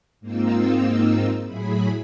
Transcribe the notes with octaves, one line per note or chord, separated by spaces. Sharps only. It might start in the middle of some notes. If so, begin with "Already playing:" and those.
G#2 A#3 C4 D#4 F4 E6
A2 F#3 E4 G#4 B5